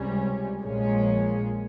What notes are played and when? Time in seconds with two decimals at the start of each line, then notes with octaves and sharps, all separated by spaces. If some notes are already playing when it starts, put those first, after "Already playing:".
Already playing: C#2 C3 G3 C#4
0.61 A#1 A#2 F3 G#3 C#4